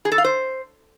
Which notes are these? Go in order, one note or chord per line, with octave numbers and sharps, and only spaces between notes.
G#4
A4
F5
C5